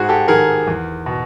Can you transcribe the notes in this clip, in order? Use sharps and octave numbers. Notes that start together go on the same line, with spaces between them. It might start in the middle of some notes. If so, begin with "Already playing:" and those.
Already playing: G#2 F#4 G#4
G4 A4
D#3 G#4 A#4
E2
B2